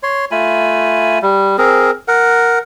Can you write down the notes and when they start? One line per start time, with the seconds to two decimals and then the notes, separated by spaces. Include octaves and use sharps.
0.03 C#5 C6
0.31 A3 F4 G#5 B5
1.22 G3
1.58 C4 G#4 A#4
2.08 A#4 F#5